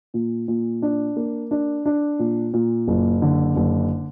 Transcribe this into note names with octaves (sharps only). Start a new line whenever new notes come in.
A#2
A#2
D4
A#3
D4
D4
A#2
A#2
F#1
D3
F#1